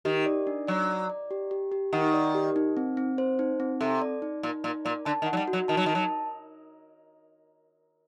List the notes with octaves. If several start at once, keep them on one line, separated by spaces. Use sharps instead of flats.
D#3 G4
D5
D4
F#3 D5
D5
D5
G4
G4
G4
D#3 F#5
D5
G4
D#4
C4
C4
C5
D#4
C4
C3 A4
D5
D#4
A#2 D#4
A#2 D#4
A#2 D5
D3 A5
D#3
F#5
F#3
G3
F#4
F#3
D#3 A5
F#3
D#3 A5
F#3